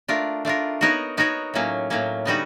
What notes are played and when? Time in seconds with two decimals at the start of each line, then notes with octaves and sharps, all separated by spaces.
0.08 A3 D4 F4 A#4
0.45 A3 D4 F4 A#4
0.81 B3 D#4 F#4 A#4 C#5
1.17 B3 D#4 F#4 A#4 C#5
1.54 A2 F#3 A#3 C#4
1.90 A2 F#3 A#3 C#4
2.25 D3 G3 B3 D#4 F#4